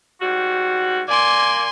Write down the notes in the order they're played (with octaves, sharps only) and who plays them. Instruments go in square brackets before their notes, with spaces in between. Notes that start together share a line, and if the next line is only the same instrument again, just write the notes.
[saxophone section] G#2 G3 F#4
[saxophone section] A#3 D5 [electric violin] G#5 C6